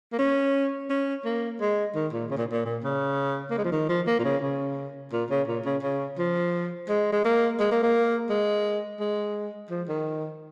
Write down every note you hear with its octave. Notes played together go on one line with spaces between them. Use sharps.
A#3
C#4
C#4
A#3
G#3
D#3
A#2
C#3
A#2
A#2
A#2
C#3
A#3
G#3
F3
D#3
F3
A#3
A#2
C#3
C#3
A#2
C#3
A#2
C#3
C#3
F3
G#3
G#3
A#3
G#3
A#3
A#3
G#3
G#3
F3
D#3